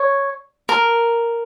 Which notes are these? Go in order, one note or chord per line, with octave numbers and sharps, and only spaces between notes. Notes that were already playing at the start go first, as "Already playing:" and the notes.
Already playing: C#5
A#4